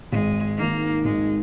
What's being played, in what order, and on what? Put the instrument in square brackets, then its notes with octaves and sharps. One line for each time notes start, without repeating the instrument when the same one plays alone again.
[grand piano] G#1 [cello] G#3
[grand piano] G#2 D#3 G#3 D#4 [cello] A#3
[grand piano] G#1 [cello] G#3